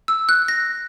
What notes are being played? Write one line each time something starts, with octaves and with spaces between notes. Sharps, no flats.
E6
F#6
A#6